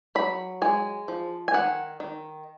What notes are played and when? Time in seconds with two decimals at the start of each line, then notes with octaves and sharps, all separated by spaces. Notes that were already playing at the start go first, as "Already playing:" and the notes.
0.15 F#3 B5
0.62 G#3 G#5
1.08 F3
1.48 G#5
1.54 D#3 F#5
2.00 D#3